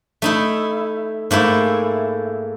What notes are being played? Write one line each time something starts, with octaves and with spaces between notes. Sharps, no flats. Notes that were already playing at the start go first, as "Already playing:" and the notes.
A3 D#4 E4
G#2 A3 A#3 E4